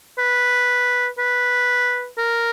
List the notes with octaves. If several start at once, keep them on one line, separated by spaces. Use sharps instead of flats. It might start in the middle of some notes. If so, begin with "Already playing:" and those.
B4
B4
A#4